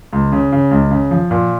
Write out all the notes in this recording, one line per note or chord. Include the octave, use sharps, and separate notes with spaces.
C#2
C#3
C#3
C#2
C#3
F3
A#2